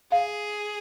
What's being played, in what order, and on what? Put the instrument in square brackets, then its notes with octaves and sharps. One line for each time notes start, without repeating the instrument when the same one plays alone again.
[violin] G#4 [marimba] F5